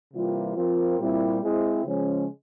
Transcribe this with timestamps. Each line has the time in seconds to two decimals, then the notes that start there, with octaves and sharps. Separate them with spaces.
0.14 C3 E3 G3 A#3 F4
0.56 F3 C4 F4 A#4
0.99 A#2 G3 C4 E4
1.42 G#3 C4 E4
1.85 C#3 F3 G#3 C#4